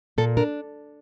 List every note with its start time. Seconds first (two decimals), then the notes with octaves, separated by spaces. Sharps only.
0.18 A#2 A4
0.37 D4 A#4